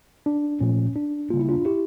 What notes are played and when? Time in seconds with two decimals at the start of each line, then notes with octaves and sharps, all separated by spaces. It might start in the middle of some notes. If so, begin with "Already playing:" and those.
0.26 D4
0.61 A#2 F3 A3 C#4
0.96 D4
1.30 C#3 G3 A#3 F4
1.39 E4
1.49 D4 F4
1.65 E4 G4